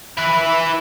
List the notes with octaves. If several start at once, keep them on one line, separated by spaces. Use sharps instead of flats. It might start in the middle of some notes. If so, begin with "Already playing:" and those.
E4 B4